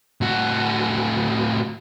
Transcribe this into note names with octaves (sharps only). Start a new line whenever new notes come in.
A2 F#4